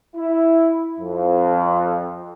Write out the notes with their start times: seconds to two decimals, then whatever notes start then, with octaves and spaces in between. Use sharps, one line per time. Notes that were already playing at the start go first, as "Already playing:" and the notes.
0.16 E4
1.00 F2